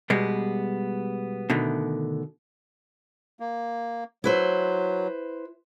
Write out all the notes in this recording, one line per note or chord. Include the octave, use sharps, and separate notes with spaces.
B2 G3 G#3 B3
B2 D3 D#3 A3
A#3
F#3 E4 B4 C5